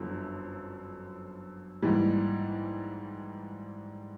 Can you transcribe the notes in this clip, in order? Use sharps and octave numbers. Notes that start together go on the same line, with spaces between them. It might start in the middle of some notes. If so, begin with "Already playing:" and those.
Already playing: G1 F#2 D3 F3
A#1 G#2 E3 G3